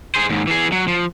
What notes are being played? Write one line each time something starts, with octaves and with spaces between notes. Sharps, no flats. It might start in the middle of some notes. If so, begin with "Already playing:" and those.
G#4 C5
D#2 G#2
E3 G#4
F#3
F3